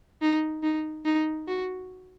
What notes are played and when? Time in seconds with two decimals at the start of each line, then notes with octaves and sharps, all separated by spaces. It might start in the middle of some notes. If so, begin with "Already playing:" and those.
0.22 D#4
0.63 D#4
1.05 D#4
1.48 F#4